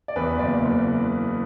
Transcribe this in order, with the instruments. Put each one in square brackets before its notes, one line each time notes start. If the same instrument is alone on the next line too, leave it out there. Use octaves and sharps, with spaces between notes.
[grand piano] D5
E2 B4
F#1 D5
F#1